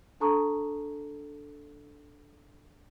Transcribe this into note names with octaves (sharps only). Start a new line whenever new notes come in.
D4 A4 A5 A#5 C#6 D#6